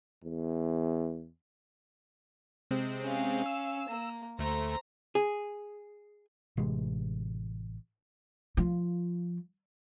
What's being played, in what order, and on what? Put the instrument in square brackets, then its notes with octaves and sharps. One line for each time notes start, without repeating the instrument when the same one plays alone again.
[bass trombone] E2
[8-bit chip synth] C3 G#3 C4
[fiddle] C#4 F5
[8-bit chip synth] E6
[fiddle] A#3
[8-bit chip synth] D2 A3 [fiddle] C5 A#5
[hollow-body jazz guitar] G#4
[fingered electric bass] A1 C3 E3 G#3
[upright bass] F3 F4